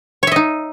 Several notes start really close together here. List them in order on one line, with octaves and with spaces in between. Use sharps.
C#5 E5 D#5 D#4